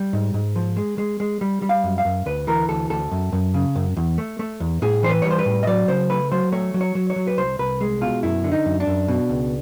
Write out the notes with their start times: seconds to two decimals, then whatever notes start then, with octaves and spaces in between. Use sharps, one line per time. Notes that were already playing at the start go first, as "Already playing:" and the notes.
Already playing: G3
0.13 G#2
0.34 G#2
0.56 F3
0.77 G#3
0.98 G#3
1.20 G#3
1.41 G3
1.62 G3
1.69 F5
1.84 F#2
1.98 F5
2.05 F#2
2.26 D2 B4
2.47 E3 A#4
2.69 D2 A4
2.90 D2 A4
3.11 F#2
3.32 F#2
3.54 C#3
3.76 F#2
3.97 E2
4.18 A3
4.39 A3
4.60 E2
4.82 A2 G#4
5.03 E3 C5
5.10 B4
5.22 G3 C#5
5.31 C5
5.39 B4
5.46 A2
5.63 D#5
5.67 F#3 D5
5.88 C#3 C5
6.10 A3 B4
6.31 F#3 C5
6.52 A3 C#5
6.74 F#3
6.81 C#5
6.95 F#3
7.10 C#5
7.16 F#3
7.27 B4
7.38 C2 C5
7.59 C2 B4
7.81 G#3
8.01 B2 F4
8.23 F#2 E4
8.44 D3
8.52 D#4
8.66 F#2
8.80 D4
8.87 F#2
9.08 B2
9.29 C#2